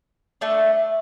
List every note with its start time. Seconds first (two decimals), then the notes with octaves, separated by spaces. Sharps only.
0.41 A3 D4 A4